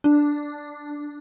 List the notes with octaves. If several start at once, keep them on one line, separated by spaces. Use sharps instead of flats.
D4